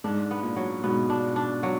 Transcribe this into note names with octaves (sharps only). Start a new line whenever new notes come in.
G#2 D4
B3
A#2
F#3
G#2 B2 B3
D4
D4
F#3